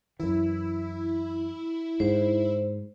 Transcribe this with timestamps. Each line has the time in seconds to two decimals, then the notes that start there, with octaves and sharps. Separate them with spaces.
0.19 F#2 E3 E4
2.00 G#2 C5